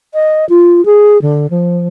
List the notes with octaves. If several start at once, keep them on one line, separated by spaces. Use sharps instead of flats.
D#5
F4
G#4
D3
F3